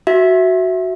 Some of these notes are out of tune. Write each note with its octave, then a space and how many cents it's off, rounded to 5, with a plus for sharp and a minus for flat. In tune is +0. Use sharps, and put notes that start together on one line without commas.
F#4 +0 E5 +0